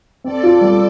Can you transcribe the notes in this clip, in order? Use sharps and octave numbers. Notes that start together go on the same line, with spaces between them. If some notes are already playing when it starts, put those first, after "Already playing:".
C4 A4 D5
F4
G3